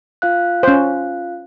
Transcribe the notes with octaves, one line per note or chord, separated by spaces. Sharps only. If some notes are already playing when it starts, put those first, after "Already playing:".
F4 F5 F#6
C#4 C5